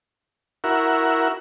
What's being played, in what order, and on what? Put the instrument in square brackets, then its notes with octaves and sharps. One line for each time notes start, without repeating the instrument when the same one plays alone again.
[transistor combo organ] E4 F#4 A#4